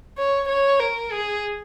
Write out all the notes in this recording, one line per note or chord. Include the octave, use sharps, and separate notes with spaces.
C#5
C#5
A#4
G#4